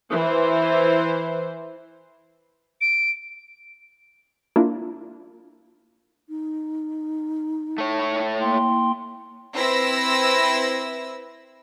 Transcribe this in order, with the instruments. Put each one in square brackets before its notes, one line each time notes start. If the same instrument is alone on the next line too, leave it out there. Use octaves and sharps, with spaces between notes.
[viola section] E3 C5
[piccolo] D7
[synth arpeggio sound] A#3 D4 E4 F4
[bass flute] D#4
[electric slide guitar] A3 C#5
[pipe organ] A#3 G5 C6 [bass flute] E4
[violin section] C4 E4 B4 E6 A#6